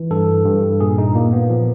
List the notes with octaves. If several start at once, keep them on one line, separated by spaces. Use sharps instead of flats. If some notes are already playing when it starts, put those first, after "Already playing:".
Already playing: E3
G2 A4
G2
A#2 G#4
D#4
A#2 A#3
B3
F3